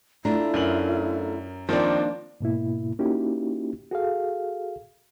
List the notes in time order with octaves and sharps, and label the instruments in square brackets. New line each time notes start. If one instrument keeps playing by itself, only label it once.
[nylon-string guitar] A3 D4 F4 [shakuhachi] E4 [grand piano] A#5
[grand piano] F#2 A#4 F#7
[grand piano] D#3 F3 C4 [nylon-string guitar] A#3 D#4 D5 [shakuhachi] D4
[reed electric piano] G#2 B2 A#3 E4
A#3 C#4 D#4 E4 F#4 G4
F#4 G#4 A4 F5